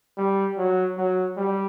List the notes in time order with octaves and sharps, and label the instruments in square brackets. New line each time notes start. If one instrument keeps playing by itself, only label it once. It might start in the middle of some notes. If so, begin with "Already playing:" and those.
[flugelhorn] G3
F#3
F#3
G3